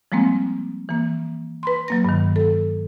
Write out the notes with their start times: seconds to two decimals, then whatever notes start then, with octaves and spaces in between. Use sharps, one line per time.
0.12 F3 G3 G#3 A#3 C4
0.89 E3 A#3
1.63 B4 B5 C6
1.88 F#3 A#3 A#6
2.05 G2 D#3
2.36 A4